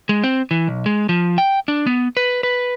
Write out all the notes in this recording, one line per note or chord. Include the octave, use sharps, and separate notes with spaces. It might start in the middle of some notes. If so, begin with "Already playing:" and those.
G#3
C4
E3
B1
G#3
F3
G5
D4
B3
B4
B4